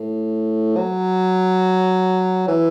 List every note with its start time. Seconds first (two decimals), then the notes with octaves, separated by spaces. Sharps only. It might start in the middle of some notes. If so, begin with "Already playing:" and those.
Already playing: A2
0.77 F#3
2.48 E3